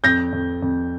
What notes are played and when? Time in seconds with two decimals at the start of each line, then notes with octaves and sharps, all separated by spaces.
0.04 F2 G6 A#6
0.32 F2
0.62 F2